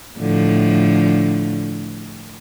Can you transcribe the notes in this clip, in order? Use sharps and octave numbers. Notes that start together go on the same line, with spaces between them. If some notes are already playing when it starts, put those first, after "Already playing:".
A2 D3 F3